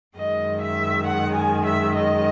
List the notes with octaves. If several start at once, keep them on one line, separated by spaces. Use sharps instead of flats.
F#2 D#3 G#3 D#5
E5
F#5
G#5
E5
D#5